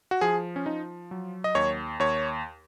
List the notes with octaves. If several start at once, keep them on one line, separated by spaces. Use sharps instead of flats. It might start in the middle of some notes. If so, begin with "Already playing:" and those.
F#4
F3 G#4
C#4
F3 D#4
F#3
D#5
D#2 C#5
D#2 C#5